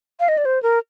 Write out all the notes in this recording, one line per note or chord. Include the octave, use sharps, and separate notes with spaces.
F5
D#5
D5
C5
A#4